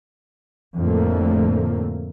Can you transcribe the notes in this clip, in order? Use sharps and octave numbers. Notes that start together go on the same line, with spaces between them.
F2 A2 D3 F3 A3 A#3